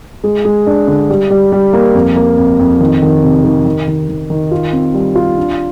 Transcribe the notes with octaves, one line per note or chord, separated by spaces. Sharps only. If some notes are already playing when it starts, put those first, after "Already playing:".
G#3
G#3
D4
D3
G3
G3
G3
A#3
F2
A#3
F2
F2
D#3
D#3
C3
D#3
D#3
D#3
D#3
D#3
F4
C4
G3
F4
D4